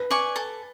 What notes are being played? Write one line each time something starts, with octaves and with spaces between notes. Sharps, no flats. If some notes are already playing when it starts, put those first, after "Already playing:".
Already playing: B4
D5 G#5 C#6
A4